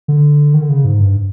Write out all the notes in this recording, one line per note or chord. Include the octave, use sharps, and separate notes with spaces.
D3
D#3
D3
C#3
G#2
G2